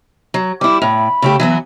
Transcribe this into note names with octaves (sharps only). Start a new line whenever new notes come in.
F#3
G3 E4 D6
A2 B5
C#3 A3 G4
E3 F#3 B3